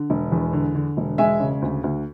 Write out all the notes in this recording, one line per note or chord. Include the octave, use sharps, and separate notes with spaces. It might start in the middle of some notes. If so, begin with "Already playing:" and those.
Already playing: D3
E1
E2
D3
D3
E1
G#3 E5 G#5
C#3
D2
D2